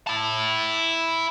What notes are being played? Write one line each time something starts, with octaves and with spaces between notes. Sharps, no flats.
E4 A5